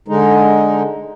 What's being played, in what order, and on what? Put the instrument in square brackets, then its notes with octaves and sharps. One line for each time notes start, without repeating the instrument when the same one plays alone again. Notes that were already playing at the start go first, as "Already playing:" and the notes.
[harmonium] D3 G#3 D#4